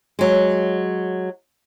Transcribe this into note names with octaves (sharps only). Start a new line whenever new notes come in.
F#3 G#3